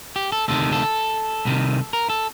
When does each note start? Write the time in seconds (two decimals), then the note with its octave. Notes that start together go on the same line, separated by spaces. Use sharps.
0.16 G4
0.32 A4
0.48 D2 C3 D#3 A4
0.72 A4
1.45 C2 C3 D#3
1.93 A#4
2.10 A4